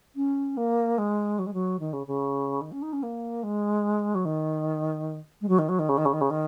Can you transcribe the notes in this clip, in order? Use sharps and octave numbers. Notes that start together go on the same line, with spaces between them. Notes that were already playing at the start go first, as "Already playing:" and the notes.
C#4
A#3
G#3
F#3
G#3
F#3
D#3
C#3
C#3
D#3
C#4
D#4
C#4
A#3
G#3
F#3
D#3
G#3
F#3
D#3
F#3
D#3
C#3
D#3
C#3
D#3
C#3
D#3